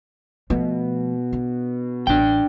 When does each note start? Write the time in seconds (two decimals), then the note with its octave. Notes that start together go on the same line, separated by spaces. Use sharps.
0.50 B2 F3 A3
1.33 D4
2.07 A1 D4 G5